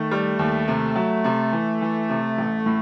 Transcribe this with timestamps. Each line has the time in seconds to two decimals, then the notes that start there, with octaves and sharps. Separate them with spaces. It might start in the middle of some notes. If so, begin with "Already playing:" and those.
Already playing: D#3 A3
0.11 G3
0.39 D#2
0.68 C3
0.95 F#3
1.24 C3
1.52 E3
1.81 E3
2.09 C3
2.38 A1
2.66 A2